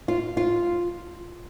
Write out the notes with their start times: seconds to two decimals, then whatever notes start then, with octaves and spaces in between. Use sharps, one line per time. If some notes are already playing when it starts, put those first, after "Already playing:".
0.08 F4
0.37 F4